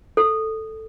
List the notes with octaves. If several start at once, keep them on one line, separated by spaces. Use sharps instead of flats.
A4